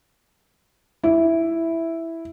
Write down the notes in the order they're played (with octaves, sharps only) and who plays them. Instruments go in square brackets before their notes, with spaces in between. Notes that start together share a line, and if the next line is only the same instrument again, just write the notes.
[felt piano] E4